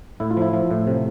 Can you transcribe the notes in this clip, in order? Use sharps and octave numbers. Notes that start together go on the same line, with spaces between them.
A2 E4
F4
F3 E4
F3
A2
C3